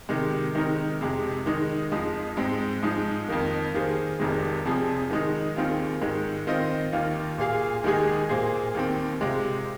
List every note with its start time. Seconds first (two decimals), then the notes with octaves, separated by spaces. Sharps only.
0.09 C3 D#3 G#3
0.55 D#3 G#3 C4 D#4 A#4
1.01 F2 C3 G#3
1.46 D#3 G#3 D#4
1.91 F2 F3 G#3 D#4
2.37 G#2 G#3 C4
2.83 G#2 F3 G#3 D#4
3.28 F2 D#3 A#3
3.74 D#3 A#3 G#4 C5
4.19 F1 F2 C3 D#3 G#3
4.65 F1 F2 F3 C4 G#4
5.10 D#3 G#3 D#4
5.56 D#2 D#3 C4 F4 G#4
6.01 G#2 D#3 G#3
6.47 D#3 C4 F4 C5 D#5
6.93 D#2 D#3 A#3 F4
7.38 A#2 A#3 G#4 F5
7.84 D#2 D#3 G#3 D#4 G#4
8.29 A#2 A#3 G#4 C5
8.75 D#2 D#3 C4
9.21 C3 G#3 C4 F4